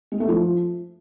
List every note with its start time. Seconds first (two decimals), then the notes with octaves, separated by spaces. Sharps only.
0.12 G#3
0.20 A3
0.29 F3